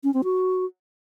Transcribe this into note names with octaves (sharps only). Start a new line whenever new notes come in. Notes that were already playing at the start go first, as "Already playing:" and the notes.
C#4
C4
F#4